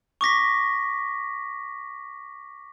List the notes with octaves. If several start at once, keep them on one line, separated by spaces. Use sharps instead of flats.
C#6 D6 A#6 B6